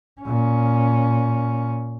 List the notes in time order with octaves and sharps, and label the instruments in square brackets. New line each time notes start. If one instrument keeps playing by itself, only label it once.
[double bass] A#2 C#4